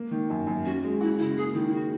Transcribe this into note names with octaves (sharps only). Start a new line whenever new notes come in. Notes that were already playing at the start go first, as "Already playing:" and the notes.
Already playing: A#3
D#3
F#2
F#2
C#4 F#4
G#3
E4 F#4
C#3 E4
A#3 G#4
D#3 E4
E4
F#4